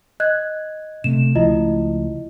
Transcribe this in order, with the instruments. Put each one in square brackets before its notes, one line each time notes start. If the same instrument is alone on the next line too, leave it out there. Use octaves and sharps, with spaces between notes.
[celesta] D#5 F#6 G#6
[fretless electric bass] C3 A3 [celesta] E7
[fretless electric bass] C#2 F3 A3 [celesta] E4 F4 D#5